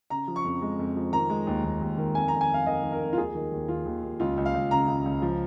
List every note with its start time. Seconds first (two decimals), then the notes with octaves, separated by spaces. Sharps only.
0.10 C#3 A#5
0.27 F3
0.36 C#6
0.44 F2
0.62 G#3
0.79 F2
0.96 F3
1.13 D#3 A#5
1.30 G#3
1.47 D#2
1.64 D#2
1.81 D#2
1.98 D#3
2.15 F2 G#5
2.28 F2 A#5
2.41 G#5
2.49 F2 F5
2.66 D#3 D#5
2.83 D#3
2.92 A#4
3.00 F2
3.13 F4
3.17 D#2 G#4
3.35 D#3
3.52 D#2
3.68 D#2 F4
3.86 D#2
4.03 D#2
4.20 C#2 F4
4.37 C#2
4.46 F5
4.54 C#2
4.71 C#3 A#5
4.88 C#2
5.05 C#2
5.22 F3